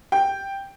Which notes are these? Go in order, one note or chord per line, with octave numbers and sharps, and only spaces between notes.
G5